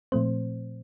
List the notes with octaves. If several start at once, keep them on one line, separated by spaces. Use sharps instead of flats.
A#2 F3 A3 C4 C5